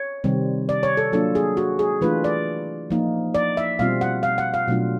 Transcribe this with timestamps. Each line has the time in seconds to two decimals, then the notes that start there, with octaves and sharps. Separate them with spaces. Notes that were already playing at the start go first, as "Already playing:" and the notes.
Already playing: C#5
0.24 C3 D#3 G3 C4
0.69 D5
0.83 C#5
0.97 A4
1.12 F#3 A#3 D4 F4 A4
1.35 G#4
1.57 F#4
1.79 G#4
2.01 E3 A3 D4 F4 B4
2.24 D5
2.90 F3 A#3 D#4
3.35 D5
3.57 E5
3.79 B2 G3 C4 F4 F5
4.01 F#5
4.23 F5
4.38 F#5
4.54 F5
4.68 B2 F#3 A3 D4 F4